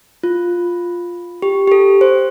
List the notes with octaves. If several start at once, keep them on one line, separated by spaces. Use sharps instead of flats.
F4
G4
G4
A4
C5